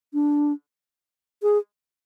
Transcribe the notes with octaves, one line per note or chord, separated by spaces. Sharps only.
D4
G#4